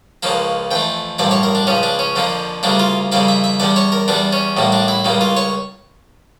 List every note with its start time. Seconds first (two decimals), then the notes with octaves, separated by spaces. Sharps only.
0.23 C#2 C#3 F3 A#3 A5
0.71 F2 E3 A3 G5
1.19 A1 G2 F3 A#3 D5
1.31 C#5
1.43 A#4
1.55 D4
1.67 C#2 C#3 F3 C#4
1.83 D4
1.99 C#4
2.16 F2 D3 F3 A#3
2.63 D2 C#3 G3 A#3 D4
2.79 F4
3.12 F2 C#3 G3 A#3 D5
3.28 E5
3.44 E5
3.60 E2 D3 G3 D5
3.76 C#5
3.92 A#4
4.08 E2 E3 G3 D4
4.33 C#4
4.57 A1 A2 G3 A#3
4.72 D4
4.88 E4
5.05 C#2 C#3 G3 A#3
5.21 F4
5.37 C#5